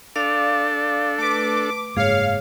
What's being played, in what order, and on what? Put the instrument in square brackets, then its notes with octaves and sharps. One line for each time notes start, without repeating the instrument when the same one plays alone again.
[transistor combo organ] D4 A4 [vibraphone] D5 F5 D6
[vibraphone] A3 B4 [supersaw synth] D6
[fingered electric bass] F#1 G#2 A#3 [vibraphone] G#4 C#5 [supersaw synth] F5